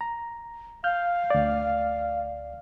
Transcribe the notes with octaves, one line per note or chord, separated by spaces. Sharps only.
A#5
F5 F6 G6
D2 D5